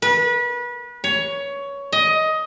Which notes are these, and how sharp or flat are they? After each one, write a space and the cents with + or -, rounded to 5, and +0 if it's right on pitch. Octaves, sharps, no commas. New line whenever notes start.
B4 -30
C#5 +15
D#5 +15